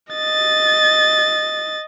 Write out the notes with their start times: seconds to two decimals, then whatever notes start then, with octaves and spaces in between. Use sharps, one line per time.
0.13 D#5 A6